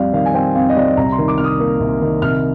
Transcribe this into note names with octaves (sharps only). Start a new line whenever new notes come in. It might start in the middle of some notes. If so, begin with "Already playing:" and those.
Already playing: F2 G3 D5 F5
D#3 F5
G#5
C4 G5
F2 F5
D#5
G3 D5
C2 A#5
C6
D#3
D6
C3 F6
D#6
A#3
C2
D#3
C2 F6